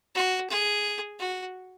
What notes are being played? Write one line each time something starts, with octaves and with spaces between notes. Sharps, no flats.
F#4
G#4
F#4